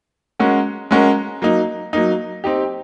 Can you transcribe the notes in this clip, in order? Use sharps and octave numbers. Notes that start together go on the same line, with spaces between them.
G#3 C#4 F#4 A#4
G#3 C#4 F#4 A#4
F#3 A#3 D#4
F#3 A#3 D#4
C4 D#4 G4